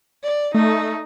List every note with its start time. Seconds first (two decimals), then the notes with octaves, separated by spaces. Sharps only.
0.23 D5
0.54 A3 D#4